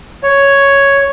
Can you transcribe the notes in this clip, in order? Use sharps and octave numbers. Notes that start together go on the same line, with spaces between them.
C#5